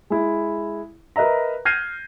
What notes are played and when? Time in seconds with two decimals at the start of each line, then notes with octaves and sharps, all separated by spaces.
0.10 G#3 E4
1.16 A#4 B4 D#5 E5 A#5
1.65 F6 G6 G#6 A#6 C7 D#7